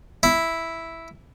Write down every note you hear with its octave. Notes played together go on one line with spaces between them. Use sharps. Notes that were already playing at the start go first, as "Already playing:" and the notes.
E4